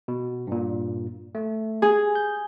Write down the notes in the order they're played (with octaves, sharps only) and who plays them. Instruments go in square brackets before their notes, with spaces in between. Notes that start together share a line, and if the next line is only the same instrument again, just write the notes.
[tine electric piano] B2
G2 A#2
A3
[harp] G#4
[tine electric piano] G6